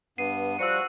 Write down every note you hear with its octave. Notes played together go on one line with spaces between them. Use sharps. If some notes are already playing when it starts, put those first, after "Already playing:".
G2 B3 C7 D#7
F3 G3 F#4 E6 C#7